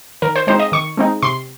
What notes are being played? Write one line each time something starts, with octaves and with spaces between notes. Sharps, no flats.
D#3 A#4
C5
G#3 C4 D#4 C5
D#5
D#3 C#6
G#3 C4 D#4
C3 C6